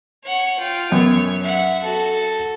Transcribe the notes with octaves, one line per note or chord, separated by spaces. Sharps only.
C#5 F#5
F4 G5
F#2 B3 C#5
E5 F#5
F#4 A4